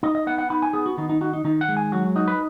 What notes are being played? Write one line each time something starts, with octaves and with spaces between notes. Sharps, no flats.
D#4 D#5
D#5
B3 F#5
F#5
D#4 B5
G#5
B3 G#4
F#4
D#3 D#4
D#4
D#4 F#4
D#4
D#3 D#4
F#5
G#3
G#5
F#3 F#4
D#4 F#4
B4